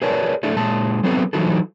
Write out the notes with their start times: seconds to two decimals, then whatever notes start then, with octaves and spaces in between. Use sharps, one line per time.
0.02 G#4 A#4 B4 C#5 D5 A5
0.43 A3 D4 E4 A4
0.56 A#2 G#3 A5
1.03 F#3 B3 C4 G#4 A4 B4
1.33 E3 F#3 D#4 E4 F#4 A4